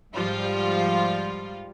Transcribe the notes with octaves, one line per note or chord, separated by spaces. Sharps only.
G#2 F3 G3 F4